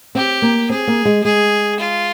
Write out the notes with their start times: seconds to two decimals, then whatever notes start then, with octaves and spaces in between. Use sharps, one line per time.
0.15 C4 G4
0.42 A#3
0.70 C4 G#4
0.87 A#3
1.05 G#3
1.24 G#3 G#4
1.79 F4